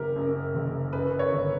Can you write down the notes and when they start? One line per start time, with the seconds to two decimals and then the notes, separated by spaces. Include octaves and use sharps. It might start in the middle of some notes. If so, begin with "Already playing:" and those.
Already playing: F#1 C#3 G4 A#4
0.16 F#2
0.55 F#1
0.93 F#2 B4
1.19 C#5
1.32 G1